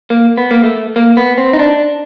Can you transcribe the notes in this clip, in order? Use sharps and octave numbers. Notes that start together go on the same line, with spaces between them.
A#3
B3
A#3
A3
A#3
B3
C4
D#4
D4